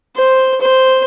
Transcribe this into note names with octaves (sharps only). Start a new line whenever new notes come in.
C5
C5